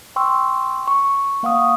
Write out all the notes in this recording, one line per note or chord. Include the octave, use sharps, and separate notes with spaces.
G5 C6 C#6 E6
C#6
A#3 F5 F#5 C#6 D#6